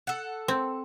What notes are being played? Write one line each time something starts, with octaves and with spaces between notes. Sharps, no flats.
A4 F#5
C4